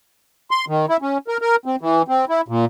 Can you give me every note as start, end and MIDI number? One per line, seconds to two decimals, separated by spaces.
0.51 0.65 84
0.68 0.86 51
0.89 0.97 64
1.02 1.18 61
1.28 1.37 70
1.41 1.56 70
1.66 1.76 60
1.81 2.02 52
2.08 2.25 60
2.29 2.41 64
2.48 2.65 46